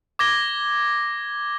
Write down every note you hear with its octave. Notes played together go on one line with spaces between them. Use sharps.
D6 G#6 A#6 G7